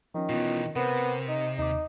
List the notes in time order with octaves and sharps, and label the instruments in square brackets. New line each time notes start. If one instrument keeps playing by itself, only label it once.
[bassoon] D#3 [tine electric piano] F3 C#4
[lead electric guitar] B2 E3 [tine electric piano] B3 C#4 F4
[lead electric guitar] C3 [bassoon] B3 [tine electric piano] A#4 C5
[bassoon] D#4
[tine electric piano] D#2 D6 [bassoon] D#4